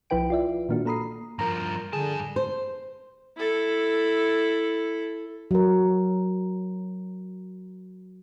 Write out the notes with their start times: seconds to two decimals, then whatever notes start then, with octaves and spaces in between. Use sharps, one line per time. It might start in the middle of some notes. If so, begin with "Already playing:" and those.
0.10 B1 F3 E4 B4 G5 D7
0.30 F4 D5 E5
0.69 A#2 D#3 A#3 D4 F#4
0.85 A#3 A4 A#5 B5 D#6 C7
1.39 G2 F3 A#4 A#5
1.93 G2 D3 G#4 A5
2.36 C5
3.37 E4 A4
5.51 F#3 A#4